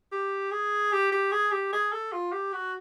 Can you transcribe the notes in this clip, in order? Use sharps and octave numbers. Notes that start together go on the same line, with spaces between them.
G4
G#4
G4
G4
G#4
G4
G#4
A4
F4
G4
F#4